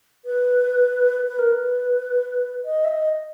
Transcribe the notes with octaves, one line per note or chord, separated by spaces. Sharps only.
B4
B4
A#4
B4
D#5
E5
D#5